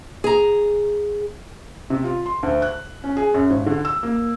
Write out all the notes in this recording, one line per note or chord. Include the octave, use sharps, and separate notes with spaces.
G#4 A#5
C3
F4
C6
D2
F#6
C#4
G#4
F#2
G#1
D3
E6
A#3